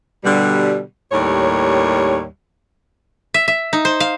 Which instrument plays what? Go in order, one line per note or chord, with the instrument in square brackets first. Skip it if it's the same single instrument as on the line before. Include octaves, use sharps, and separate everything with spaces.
[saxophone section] B2 D3 G3
D#2 A2 G3 C#5
[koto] E5
E5
D#4
C5
F5